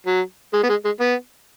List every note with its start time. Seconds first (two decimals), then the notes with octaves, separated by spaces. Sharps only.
0.06 F#3
0.53 G#3
0.63 B3
0.69 G#3
0.85 G#3
1.00 B3